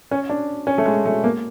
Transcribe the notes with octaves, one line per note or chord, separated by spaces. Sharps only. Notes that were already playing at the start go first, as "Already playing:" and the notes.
C#4
D4
C#4
A3
G#3
A3
A#3